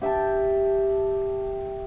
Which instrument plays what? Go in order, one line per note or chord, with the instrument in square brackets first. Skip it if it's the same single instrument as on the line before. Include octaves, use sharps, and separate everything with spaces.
[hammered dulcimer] G4 E5 G5 A5